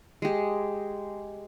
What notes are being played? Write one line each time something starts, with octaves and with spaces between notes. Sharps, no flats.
G#3 G4